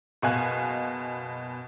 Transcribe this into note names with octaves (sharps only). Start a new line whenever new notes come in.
F#1 B2 F5 G#5 F#6